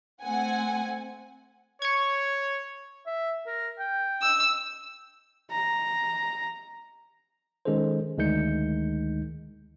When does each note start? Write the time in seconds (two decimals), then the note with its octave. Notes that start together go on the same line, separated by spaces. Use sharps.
0.22 A3 C4 F#5 G#5
1.82 C#5 C#6 G#6
3.06 E5
3.47 A#4
3.79 G5
4.22 E6
5.51 A#5
7.65 D#3 G#3 C#4 G#4 A4 C5
8.18 D2 D#3 G#3 D#4 G6 C#7